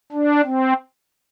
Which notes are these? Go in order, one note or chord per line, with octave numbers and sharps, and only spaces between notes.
D4
C4